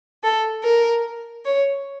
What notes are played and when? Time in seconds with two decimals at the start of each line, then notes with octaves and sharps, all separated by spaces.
0.23 A4
0.63 A#4
1.45 C#5